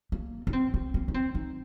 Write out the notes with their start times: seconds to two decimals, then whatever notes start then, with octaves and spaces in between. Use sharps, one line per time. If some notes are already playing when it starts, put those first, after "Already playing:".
0.12 A#3
0.47 D#4
0.53 C4
0.74 C4
0.94 A#3
1.08 D#4
1.14 C4
1.35 D#4